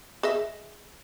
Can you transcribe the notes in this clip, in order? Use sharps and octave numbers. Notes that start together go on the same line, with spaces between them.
G#4 D#5 E5